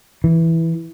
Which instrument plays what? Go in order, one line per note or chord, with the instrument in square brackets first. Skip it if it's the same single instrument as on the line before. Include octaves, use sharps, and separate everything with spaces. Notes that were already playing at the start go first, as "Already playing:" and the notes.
[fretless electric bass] E3